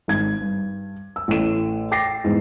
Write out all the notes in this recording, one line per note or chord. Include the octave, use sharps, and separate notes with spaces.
G#1 G#6
G2
E6
A1 A3 E7
G5 D6 A6 A#6 C7
E2 G#2